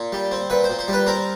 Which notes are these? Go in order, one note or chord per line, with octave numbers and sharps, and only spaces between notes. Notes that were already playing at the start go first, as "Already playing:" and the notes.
Already playing: A#2
G3
C4
A#2 B4
C5
A#2
C5
G3
B4
C4 A#4